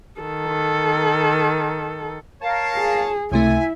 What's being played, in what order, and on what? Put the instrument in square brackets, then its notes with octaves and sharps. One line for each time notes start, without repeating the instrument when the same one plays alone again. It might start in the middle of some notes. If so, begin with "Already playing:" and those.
[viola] D#3 A4
[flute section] A#4 F5 [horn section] C#5 A5
[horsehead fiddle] G#4
[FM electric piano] C#2 C3 A3 [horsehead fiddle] E4 [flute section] E5 [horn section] G#5